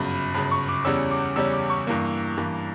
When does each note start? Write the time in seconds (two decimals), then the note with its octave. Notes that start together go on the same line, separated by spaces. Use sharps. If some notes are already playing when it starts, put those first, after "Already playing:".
Already playing: G1 F#2 C#3 B5
0.34 G1 F#2 C#3 B5
0.51 C#6
0.69 D6
0.85 E2 C#3 G3 C#4 E6
1.11 D6
1.36 E2 C#3 G3 C#4 E6
1.53 D6
1.70 C#6
1.87 G2 E3 A#3
2.38 G2 E3 A#3